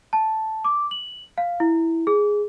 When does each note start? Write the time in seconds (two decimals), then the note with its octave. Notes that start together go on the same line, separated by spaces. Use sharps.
0.13 A5
0.65 D6
0.91 F#7
1.38 F5
1.60 E4
2.07 G#4